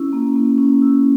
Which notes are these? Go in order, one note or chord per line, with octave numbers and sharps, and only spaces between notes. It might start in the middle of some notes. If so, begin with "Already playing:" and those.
Already playing: C#4 E4
A#3
A#3
C#4
E4